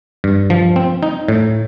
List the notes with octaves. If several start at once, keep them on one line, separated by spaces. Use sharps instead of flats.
G2
F3
C4
D#4
A2